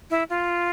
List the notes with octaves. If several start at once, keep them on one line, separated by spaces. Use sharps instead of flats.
E4
F4